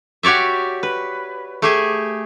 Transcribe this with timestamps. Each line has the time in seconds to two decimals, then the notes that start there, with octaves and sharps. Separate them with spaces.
0.23 F#4 G4 C#5 D5 E5
0.83 B4
1.62 A3 G4 G#4